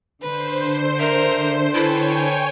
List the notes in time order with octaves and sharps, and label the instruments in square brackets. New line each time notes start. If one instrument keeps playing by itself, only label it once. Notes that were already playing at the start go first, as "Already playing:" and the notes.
[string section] D3 [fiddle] B4 [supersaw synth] C5
[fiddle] A#4 [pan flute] E5
[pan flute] E4 [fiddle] A4 B4 [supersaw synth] C#5 G5 G#5